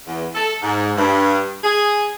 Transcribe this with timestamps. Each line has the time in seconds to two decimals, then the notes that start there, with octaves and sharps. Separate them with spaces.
0.07 E2
0.35 A4
0.62 G#2
0.97 G2
1.64 G#4